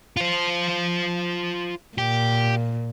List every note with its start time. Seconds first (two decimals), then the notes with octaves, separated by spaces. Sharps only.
0.17 F4 C5
1.98 A#2 G4